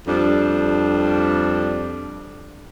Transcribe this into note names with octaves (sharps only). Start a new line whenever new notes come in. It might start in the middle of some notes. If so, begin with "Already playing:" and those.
F2 G3 D4